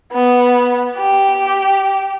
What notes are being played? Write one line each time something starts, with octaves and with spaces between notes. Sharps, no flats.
B3
G4